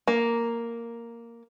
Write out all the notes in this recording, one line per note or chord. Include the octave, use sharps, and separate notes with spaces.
A#3